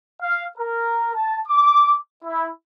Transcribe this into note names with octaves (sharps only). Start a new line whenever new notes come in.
F5
A#4
A5
D6
E4